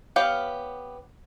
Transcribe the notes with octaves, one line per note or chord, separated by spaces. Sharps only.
B3 G4 C#5 F5